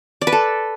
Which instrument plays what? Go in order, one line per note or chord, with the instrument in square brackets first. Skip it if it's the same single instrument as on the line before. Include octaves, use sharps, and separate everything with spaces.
[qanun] D5
B4
A4